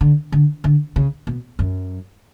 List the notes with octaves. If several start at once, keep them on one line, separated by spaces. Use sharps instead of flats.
D3
D3
D3
C#3
B2
F#2